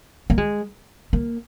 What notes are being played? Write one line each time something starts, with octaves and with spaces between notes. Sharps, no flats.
A#3
G#3
A#3